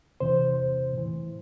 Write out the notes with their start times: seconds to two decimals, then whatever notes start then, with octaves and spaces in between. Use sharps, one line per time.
0.20 E2 C3 E3 C5
0.93 A2 E3